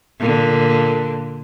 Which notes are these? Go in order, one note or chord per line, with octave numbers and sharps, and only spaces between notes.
A#2 D3